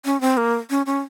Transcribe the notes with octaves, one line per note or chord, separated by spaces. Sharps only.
C#4
C4
A#3
C#4
C#4